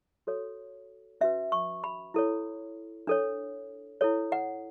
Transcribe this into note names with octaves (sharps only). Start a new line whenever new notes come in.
F#4 A4 C#5
C#4 F#4 B4 E5
C#6
B5
E4 A4 C#5
D4 A4 C#5
E4 A4 C#5
F#5